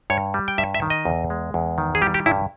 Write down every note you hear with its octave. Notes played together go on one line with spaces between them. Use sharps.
G2 C#5
G3
G5
G2 E5
E5
D#3
D#5
E2
G#3
E2
D#3
G#4
G3 G4
G4
G2 E4